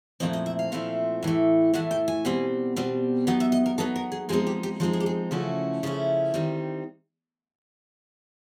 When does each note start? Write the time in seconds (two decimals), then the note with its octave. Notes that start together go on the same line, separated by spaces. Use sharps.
0.20 A#2 F3 A3 C4 E4 D#5
0.33 D#5
0.46 E5
0.59 F5
0.72 A#2 F3 A3 C4 E4
1.23 A2 E3 A3
1.74 A2 E3 A3 F#5
1.91 G5
2.08 G#5
2.25 B2 G3 C4
2.76 B2 G3 C4
3.27 F#3 B3 D#4 G5
3.40 E5
3.52 D#5
3.66 A#4
3.78 F#3 B3 D#4 A4
3.96 A#4
4.12 G#4
4.29 F3 G#3 C4 D#4 G#4
4.47 G4
4.63 G4
4.80 F3 G#3 C4 D#4 F#4
4.93 G#4
5.00 G4
5.06 G#4
5.31 C#3 F3 A3 C#4 E4 F#4
5.83 C#3 F3 A3 C#4 E4
6.34 D#3 G3 C4 D#4